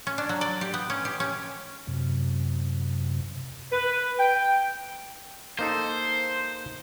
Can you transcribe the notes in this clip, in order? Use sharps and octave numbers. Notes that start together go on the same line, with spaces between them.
C#4
D4
F#3
D5
G4
B3
C#4
G4
C#4
F#2 C3
B4
G5
A#3 D#4 A4 C5